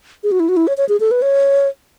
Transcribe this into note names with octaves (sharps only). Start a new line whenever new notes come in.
G#4
F#4
E4
F#4
E4
C#5
C#5
G#4
A4
B4
C#5